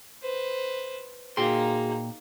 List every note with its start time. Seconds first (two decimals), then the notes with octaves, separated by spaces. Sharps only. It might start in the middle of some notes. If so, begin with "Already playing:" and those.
0.22 B4 C5
1.37 A#2 A#3 D#4 F#4 G#4 G5 C6